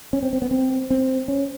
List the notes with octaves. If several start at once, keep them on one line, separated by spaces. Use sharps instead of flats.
C#4
C4
C4
B3
C4
C4
C#4